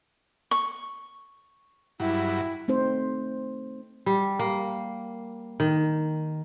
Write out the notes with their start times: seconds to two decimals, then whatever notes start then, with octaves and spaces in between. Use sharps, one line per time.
0.51 C#6
2.00 G2 F#3 E4
2.68 A3 C4 D#4 C5
4.06 G3
4.39 A#3
5.60 D#3